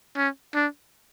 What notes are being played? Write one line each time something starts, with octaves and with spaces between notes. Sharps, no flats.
C#4
D4